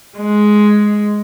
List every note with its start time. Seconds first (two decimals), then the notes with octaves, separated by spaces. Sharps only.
0.17 G#3